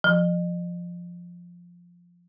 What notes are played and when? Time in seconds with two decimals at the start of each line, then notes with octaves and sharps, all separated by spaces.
0.04 F3